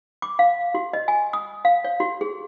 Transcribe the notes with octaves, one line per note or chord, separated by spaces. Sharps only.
D6
F5
F#4
D#5
G#5
D#6
F5
C#5
F#4
G#4